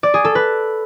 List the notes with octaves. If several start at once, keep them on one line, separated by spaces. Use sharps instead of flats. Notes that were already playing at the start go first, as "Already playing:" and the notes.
D5
G#4
A4
B4